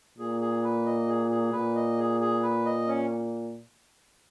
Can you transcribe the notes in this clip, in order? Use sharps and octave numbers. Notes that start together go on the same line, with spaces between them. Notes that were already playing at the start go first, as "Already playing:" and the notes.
A#2 G#4
G#4
B4
D#5
G#4
G#4
A#2 B4
D#5
G#4
G#4
B4
D#5
C#4